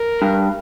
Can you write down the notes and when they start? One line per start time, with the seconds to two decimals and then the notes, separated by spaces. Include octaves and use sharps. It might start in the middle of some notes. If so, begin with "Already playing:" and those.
Already playing: A#4
0.22 G2